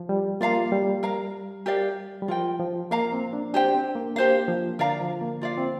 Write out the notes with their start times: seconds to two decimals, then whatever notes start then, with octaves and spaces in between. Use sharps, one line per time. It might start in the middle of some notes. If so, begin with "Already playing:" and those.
Already playing: F3
0.09 G3
0.41 A#3 F4 D5 F5 A#5
0.72 G3
1.03 A#4 F5 A#5
1.66 G4 A#4 D5 F5
2.22 G3
2.28 F3 F4 A#4 G5
2.60 F3
2.91 A#3 A#4 F5 A#5
3.12 C4
3.33 D4
3.54 D4 G4 C5 G5
3.75 C4
3.96 A#3
4.16 A#3 G4 C5 F5
4.48 F3
4.79 D3 A#4 D5 F5 A#5
5.00 F3
5.21 A#3
5.41 F4 D5 F5
5.58 C4